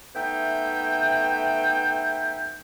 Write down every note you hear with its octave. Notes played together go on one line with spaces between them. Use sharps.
A3 B3 D#4 E5 G5